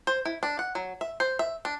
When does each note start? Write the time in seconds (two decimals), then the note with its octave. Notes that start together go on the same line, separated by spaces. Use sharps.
0.07 C5
0.25 E4
0.43 D4
0.59 F#5
0.75 F#3
1.01 E5
1.20 C5
1.39 E5
1.65 D4